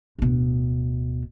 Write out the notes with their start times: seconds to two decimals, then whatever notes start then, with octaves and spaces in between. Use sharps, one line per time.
0.19 D1 B2